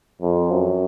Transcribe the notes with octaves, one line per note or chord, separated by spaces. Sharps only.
F2
F#2